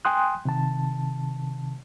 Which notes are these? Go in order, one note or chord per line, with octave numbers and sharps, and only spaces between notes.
G5 G#5 C6 D#6 F#6
C3 D#3 A5